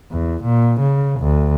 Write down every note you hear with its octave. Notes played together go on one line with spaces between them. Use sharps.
E2
A#2
C#3
D2